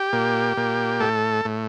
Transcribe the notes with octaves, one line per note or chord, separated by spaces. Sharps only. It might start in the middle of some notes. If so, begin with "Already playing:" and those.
Already playing: G4
A#2
A#2
A2 A4
A2